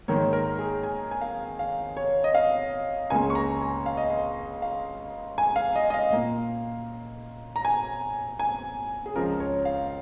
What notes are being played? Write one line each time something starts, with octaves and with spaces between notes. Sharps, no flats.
G#2 D#3 A#3 C#5
A#4
G#4
G#5
G#5
F5
F5
C#5
D#5
F5
C#2 C#3 A#3 G#5
C#6
A#5
G#5
F5
D#5
F5
F5
G#5
F5
D#5
D#5
F5
A#2 A#3
A#5
G#5
G#5
G#4
C#2 C#3 F3 A#4
C#5
F5